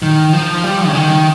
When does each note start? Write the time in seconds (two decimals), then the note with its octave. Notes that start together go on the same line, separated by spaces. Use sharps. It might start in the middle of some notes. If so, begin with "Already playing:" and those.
0.02 D#3
0.33 F3
0.64 G3
0.87 C#3
0.95 D#3